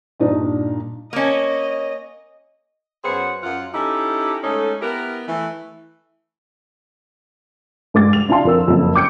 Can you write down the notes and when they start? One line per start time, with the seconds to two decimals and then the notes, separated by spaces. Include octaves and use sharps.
0.20 G2 A#2 D4 D#4
1.13 A#3 C#4 D#5
3.04 F#2 B3 G#4 C5 C#5 F#5
3.43 F#2 F4 F#5
3.74 C#4 D#4 E4 G4 A4 D#5
4.44 G#3 A3 C#4 D#4 A4
4.82 B3 E4 G4 A#4
5.28 E3 A3
7.94 G2 G#3 D6 A6
8.13 F7
8.29 D4 E4 D5 F5 A5 C6
8.45 F2 A#4 E6
8.68 F#1 F2
8.96 D6 G6 C#7 D7